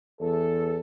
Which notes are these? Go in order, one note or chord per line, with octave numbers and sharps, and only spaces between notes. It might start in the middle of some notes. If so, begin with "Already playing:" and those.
E2 A4